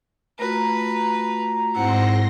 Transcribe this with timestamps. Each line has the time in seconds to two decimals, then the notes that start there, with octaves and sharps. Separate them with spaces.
0.39 A3 F4 F#4 B4 A#5
1.75 G#2 C4 E4 F#5 C6 A#6